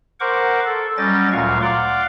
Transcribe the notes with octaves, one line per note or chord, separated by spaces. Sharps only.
A#4 C5 F#5 C#6 D6
A4
F#3 G3 C#4 D#5 G5 A6
D2 A#2 F#3 F5 C#6
D5 F5 F#5 C6 D6